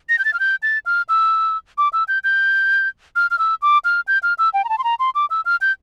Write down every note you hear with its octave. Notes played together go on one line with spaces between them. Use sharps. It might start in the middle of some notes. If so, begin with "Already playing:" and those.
A#6
G6
A6
F6
G6
A6
F6
E6
D6
E6
G6
G6
F6
F6
E6
D6
F6
G6
F6
E6
G5
A#5
A5
C6
A#5
C6
D6
E6
F6
G6